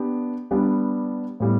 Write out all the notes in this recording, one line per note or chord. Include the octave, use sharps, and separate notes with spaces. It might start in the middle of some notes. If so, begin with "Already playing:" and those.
Already playing: B3 D4 G4
G3 B3 D4 G4
A2 G3 B3